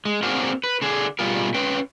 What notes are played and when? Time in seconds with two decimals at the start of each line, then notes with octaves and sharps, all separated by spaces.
0.05 G#3
0.23 A#3 C4 D4 F#4 G#4 A#4
0.64 B4
0.82 D3 D4 G#4
1.19 B2 G3 F4 G#4 A#4
1.54 C#4 B4 G5